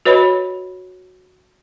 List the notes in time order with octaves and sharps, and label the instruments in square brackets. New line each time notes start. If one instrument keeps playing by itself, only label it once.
[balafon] F#4 B4 C#5 D#5 B5